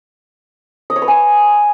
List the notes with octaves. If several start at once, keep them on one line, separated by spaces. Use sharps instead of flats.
D#5
C#5
B4
G#5